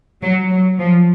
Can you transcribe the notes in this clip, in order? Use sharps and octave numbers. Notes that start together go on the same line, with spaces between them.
F#3
F#3
F3